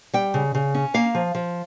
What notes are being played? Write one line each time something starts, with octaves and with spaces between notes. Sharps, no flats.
G3 G5
C#3
C#3
C#4
A#3 F5
F3
F3